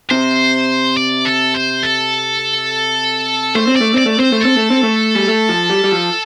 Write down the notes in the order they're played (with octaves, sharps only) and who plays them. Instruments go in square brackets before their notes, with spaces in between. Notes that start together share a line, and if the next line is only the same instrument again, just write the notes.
[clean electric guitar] C3 [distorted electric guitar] C5
[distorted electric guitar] D5
A4
C5
A4
[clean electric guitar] A3 [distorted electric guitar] C5
[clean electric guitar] C4
[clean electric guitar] A3 [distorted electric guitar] D5
[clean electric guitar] C4 [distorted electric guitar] D5
[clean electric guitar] A3
[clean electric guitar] C4 [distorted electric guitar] C5
[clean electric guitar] A3
[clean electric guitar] C4 [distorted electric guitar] A4
[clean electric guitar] A3
C4
A3
G3
A3
F3
G3
G3
F3